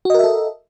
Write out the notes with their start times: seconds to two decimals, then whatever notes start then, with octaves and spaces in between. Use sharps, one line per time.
0.05 F#4
0.10 D#5
0.14 A#4
0.19 E5
0.24 A4